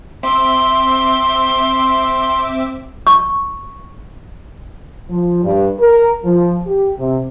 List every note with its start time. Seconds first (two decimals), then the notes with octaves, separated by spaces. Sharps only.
0.23 C4 E5 C6 D6
3.07 C#6
5.10 F3
5.43 G2
5.79 A#4
6.24 F3
6.66 G4
6.99 C3